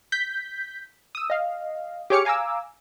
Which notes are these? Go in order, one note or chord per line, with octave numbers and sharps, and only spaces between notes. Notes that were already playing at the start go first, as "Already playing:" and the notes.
G6 B6
D#6 E6
D#5 F5
G4 G#4 C#5 D6 F6 C#7
F5 G#5 A#5 D6 E6